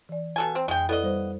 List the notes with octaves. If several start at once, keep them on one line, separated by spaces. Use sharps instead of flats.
E3 D5
B2 A4 G#5
C4
F2 G#3 G5
B3 E4 A4 D5 D#5
G3 C5